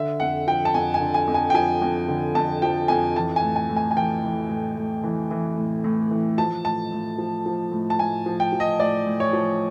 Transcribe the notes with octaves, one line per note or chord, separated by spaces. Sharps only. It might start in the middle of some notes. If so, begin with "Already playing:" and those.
Already playing: D3 E5
F2 F#5
F3 G5
A5
F2 G#5
G#5
D3
G#5
F2
G#5
G5
F3 G#5
F2
D3
F2 A5
F3 G5
F2 G#5
E3 A5
G#5
A2
G#5
A2
G#5
G#5
E3 G5
E3
A2
A2
E3
E3
A2
A2
E3
F3 A5
A2 A5
A2
F3
F3
A2
A5
A2 G#5
F3
G5
F3
D#5
A2 D5
A2
C#5
F3